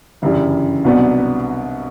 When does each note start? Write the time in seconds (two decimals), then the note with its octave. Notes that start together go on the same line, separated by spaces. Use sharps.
0.22 G1 F#2 C#3 E3 G3
0.85 C2 B2 F#3 B3 D4